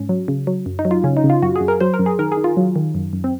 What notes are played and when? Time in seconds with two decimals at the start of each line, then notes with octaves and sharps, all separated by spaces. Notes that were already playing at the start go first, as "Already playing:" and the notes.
Already playing: G#2 C#4
0.09 F#3
0.28 C#3
0.47 F#3
0.66 F#2
0.79 D#4
0.85 F#3
0.91 F4
1.04 C#3 C#4
1.17 D#4
1.24 C#3
1.30 F4
1.42 F#2 F#4
1.56 G#4
1.61 F#2
1.68 A#4
1.80 F#3 C5
1.94 A#4
1.99 F#2
2.06 G#4
2.19 D#3 A#4
2.32 G#4
2.37 D#3
2.44 F4
2.57 F#3
2.76 D#3
2.95 F#2
3.13 F#2
3.24 C4